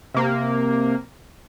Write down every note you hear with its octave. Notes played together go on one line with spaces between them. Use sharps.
C3 A#3